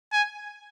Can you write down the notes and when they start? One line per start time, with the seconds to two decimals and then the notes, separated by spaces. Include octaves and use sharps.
0.12 G#5